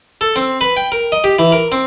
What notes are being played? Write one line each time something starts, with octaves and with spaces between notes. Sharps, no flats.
A4
C4
B4
G5
A#4
D#5
G4
E3
A#4
C4